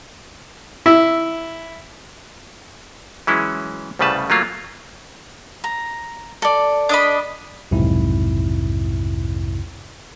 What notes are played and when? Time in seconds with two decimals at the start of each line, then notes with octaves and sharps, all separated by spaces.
0.86 E4
3.27 E3 F#3 G#3 C#4 E4
3.99 C2 A2 C#3 G3 B4 A5
4.30 F#3 A3 A#3 F4
5.64 A#5
6.42 A4 D5
6.89 D4 D#5 B5
7.71 B1 F2 G#2 C3 E4